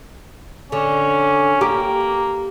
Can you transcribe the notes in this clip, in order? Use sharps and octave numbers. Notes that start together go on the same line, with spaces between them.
D3 C#4
A#3 G4